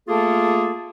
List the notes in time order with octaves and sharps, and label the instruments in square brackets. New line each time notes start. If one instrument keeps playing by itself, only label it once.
[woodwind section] A3 A#3 F4 G#4 A4